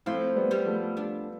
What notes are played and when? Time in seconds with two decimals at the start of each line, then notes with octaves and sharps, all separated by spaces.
0.06 F3 A3 C4 E4
0.36 G3 B3
0.51 G3 B3
0.66 F3 A3
0.97 B3 D4